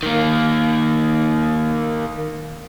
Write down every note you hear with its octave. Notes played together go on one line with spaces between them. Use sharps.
D#3 A#3